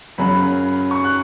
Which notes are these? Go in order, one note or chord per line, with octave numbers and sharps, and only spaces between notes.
F#2 C#3 F#3 B5
C#6
F#6